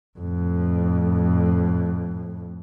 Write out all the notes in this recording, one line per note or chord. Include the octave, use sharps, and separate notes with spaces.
F2 A2